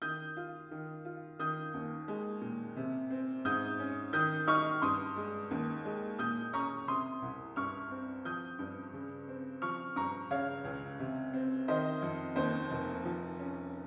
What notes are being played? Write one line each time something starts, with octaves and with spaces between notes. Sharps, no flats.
D#3 D#6 G6
F4
D#3
F4
D#3 D#6 G6
D#2
G#3
A#2
C3
C4
G#2 D#6 G6
C#4
D#3 D#6 G6
D#4 C#6 F6
G2 C6 D#6
G#3
D#2
G#3
A#2 D#6 G6
C#4 A#5 C#6
C3 C6 D#6
C2
G2 C#6 F6
C4
F3 D#6 G6
G2
C#3
C4
F3 C#6 F6
G2 A#5 C#6
C#3 C#5 F5
C#2
C3
C4
D#3 C5 D#5
F2
D#2 C5
F1
F3
C#4